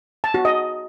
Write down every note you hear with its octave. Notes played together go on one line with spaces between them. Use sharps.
A5
F#4
D#5